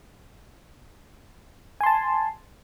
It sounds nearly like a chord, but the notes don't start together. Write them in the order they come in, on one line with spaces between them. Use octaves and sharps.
G#5 C6 A5